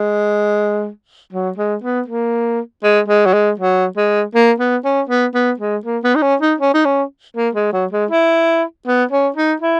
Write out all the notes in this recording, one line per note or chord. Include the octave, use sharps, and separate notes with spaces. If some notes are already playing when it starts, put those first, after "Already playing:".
Already playing: G#3
F#3
G#3
B3
A#3
G#3
G#3
F#3
G#3
F#3
G#3
A#3
B3
C#4
B3
B3
G#3
A#3
B3
D#4
C#4
D#4
C#4
D#4
C#4
A#3
G#3
F#3
G#3
E4
B3
C#4
D#4
E4